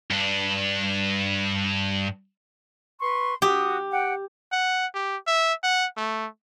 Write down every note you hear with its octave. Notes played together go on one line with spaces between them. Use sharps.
G2 D4
B4 C6 C#6
F#4 G4 D#6
F#5 G5
F#5
G4
E5
F#5
A3